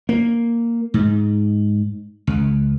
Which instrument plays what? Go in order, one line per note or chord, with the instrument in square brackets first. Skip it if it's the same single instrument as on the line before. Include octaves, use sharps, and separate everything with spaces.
[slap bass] A#3
G#2
C#2